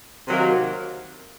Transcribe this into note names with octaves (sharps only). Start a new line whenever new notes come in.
C3 D#3 F#3 A#3